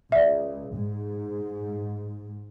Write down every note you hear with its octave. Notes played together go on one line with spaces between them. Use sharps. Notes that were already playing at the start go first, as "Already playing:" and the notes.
C#2 D5 E5
G#2